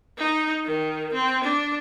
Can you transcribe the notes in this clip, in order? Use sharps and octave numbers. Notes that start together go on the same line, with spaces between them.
D#4
D#3
C4
D4